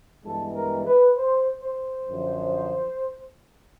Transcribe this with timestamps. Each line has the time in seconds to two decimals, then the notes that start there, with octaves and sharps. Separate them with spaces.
0.23 G2 E3 G#3 B3 A4
0.54 A#4
0.86 B4
1.16 C5
1.63 C5
2.08 F#2 D3 F3